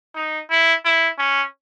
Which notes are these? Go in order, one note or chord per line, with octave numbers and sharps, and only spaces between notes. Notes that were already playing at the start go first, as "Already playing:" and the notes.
D#4
E4
E4
C#4